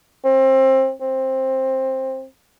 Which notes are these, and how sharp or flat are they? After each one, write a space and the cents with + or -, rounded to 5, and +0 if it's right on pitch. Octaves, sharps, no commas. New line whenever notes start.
C4 +25
C4 +15